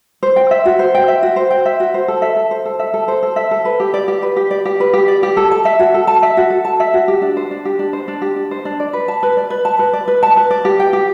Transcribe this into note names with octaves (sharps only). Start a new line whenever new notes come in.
C5
G5
E5
F#4
C5
G5
E5
F#4
C5
G5
E5
F#4
C5
A4
E5
A4
C5
A4
E5
A4
C5
A4
E5
A4
B4
G4
D5
G4
B4
G4
D5
G4
B4
G4
D5
G4
A4
A5
E5
F#4
A4
A5
E5
F#4
A4
A5
E5
F#4
G4
D4
C5
D4
G4
D4
C5
D4
G4
D4
C5
D4
D5
B4
A5
B4
D5
B4
A5
B4
D5
B4
A5
B4
D5
G4
G5
G4